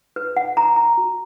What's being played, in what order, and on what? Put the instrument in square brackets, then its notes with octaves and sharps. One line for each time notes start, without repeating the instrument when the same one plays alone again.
[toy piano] B4
F#5
A#5
A#5
F#4